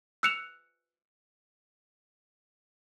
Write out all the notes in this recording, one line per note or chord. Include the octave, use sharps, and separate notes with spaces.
E6 F#6 C#7 E7 F7